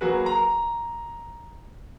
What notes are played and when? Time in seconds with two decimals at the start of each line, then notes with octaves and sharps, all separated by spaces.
0.01 F#3 A#3 F#4 G#4 B4
0.26 A#5